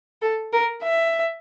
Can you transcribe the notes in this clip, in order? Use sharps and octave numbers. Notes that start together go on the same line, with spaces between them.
A4
A#4
E5